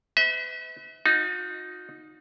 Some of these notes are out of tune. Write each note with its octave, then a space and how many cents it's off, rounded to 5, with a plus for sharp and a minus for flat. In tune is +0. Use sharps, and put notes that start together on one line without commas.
B4 +35 E5 -40
D#4 +0 F#4 -45